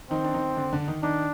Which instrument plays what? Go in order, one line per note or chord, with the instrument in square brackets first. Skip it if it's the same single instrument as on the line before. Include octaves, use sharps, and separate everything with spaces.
[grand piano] D#3 D#4 [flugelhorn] C4
[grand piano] D4
D#3 D#4
D3 D4
D3 D4
D#3 D#4
[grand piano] D#3 D#4 [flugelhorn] D4